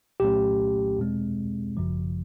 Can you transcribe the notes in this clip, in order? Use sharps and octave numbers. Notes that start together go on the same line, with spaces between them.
C2 A#2 F#3 A3 C#4 G4
E2 B2 G#3 C4
G#1 F#2 C#3 F3